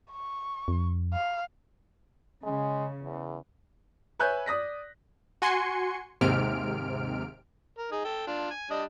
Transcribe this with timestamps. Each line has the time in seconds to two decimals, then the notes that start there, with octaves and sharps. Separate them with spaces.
0.12 C#6
0.68 F2
1.13 F5
2.44 C#3 G#3
3.03 E2
4.19 B4 C#5 E5 G#5 F#6 G6
4.46 D5 D#6 A#6 B6
5.42 F#4 G#5 C6 C#7
6.21 D#2 G#2 C3 F6 D7
7.78 A#4
7.92 D#4 G#4
8.05 A4 G5
8.27 D4 F4
8.50 G#5
8.70 G3 D4 D#5